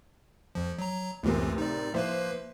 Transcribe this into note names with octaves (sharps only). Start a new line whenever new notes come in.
F2 F3
F#3 A#5
C#2 F#2 A2 C3 E3 A#3
D#4 D5
F3 A#3 E4 B4 C5